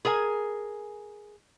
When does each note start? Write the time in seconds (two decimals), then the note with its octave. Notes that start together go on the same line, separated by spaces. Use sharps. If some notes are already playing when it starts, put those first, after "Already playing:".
0.05 G#4 A#4 G#5